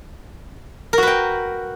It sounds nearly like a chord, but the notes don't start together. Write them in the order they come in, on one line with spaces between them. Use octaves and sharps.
A#4 F#4 B4 G5